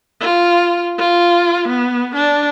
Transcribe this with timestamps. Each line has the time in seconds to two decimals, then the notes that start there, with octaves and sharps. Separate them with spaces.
0.21 F4
0.98 F4
1.69 B3
2.15 D4